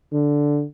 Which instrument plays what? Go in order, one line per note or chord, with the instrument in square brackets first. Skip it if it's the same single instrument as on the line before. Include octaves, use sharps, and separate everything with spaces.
[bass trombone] D3